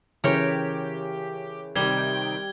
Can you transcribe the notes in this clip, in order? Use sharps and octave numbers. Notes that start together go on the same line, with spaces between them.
C#3 E3 C#4 G4 A#4 C#5 G5
C3 D#3 G3 G5 G#6 G7